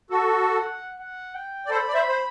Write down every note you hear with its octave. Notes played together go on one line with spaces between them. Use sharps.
F#4 A4
F#5
F#5
G5
D5
A4 C5 B5
D5
C5 E5
C5